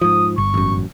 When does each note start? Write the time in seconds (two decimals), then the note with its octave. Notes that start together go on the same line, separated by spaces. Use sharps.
0.01 G#2 F3 D#6
0.38 G1 C#6
0.54 A1 F#2